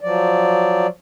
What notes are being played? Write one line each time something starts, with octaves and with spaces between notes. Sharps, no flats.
F3 F#3 D5